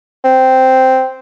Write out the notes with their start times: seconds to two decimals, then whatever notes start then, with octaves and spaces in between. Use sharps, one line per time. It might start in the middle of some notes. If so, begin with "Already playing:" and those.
0.24 C4